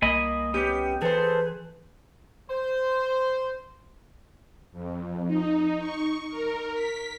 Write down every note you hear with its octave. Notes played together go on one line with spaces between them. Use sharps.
C2 A#3 D#5 G#5 B5
B3 C#4 G4
E3 G#4 A4 B4 C5
C5
F2
D#4
C#6
A#4
B6